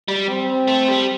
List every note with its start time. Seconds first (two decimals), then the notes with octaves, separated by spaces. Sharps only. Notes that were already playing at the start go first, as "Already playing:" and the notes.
0.08 G3
0.29 C4
0.68 A3
0.88 G3